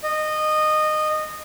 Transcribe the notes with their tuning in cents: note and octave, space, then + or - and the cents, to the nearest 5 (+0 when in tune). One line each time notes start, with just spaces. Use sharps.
D#5 -20